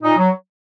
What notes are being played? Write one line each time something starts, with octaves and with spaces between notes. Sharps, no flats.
A#2 D#4
F#3